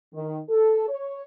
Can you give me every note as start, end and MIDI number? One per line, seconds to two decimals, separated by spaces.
0.13 0.38 51
0.49 0.86 69
0.88 1.22 73